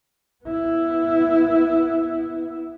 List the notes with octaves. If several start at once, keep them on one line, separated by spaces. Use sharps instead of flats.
B3 E4